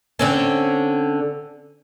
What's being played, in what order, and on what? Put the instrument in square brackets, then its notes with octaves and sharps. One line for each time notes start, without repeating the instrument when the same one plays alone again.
[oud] D3 C4 C#4